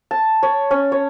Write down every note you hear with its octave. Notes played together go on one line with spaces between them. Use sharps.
A5
C#5
C#4
C#5